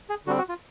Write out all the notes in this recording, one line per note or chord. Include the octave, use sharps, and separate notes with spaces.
G#4
D3 G3 C4 F#4
F#4
F4